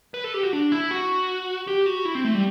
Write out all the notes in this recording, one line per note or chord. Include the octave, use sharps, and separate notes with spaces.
B4
A4
G4
F#4
D4
E4
F#4
G4
F#4
E4
C4
A3
G3